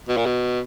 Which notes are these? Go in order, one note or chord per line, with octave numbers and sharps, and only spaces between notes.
B2
A#2
B2